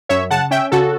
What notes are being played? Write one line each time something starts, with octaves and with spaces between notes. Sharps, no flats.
F#2 C#5 E5
C#3 F#5 A5
C#4 E5 G5
C#3 F#4 A4